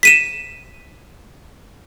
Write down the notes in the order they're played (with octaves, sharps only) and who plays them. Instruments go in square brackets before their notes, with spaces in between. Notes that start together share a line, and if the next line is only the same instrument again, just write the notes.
[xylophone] B6 D#7 E7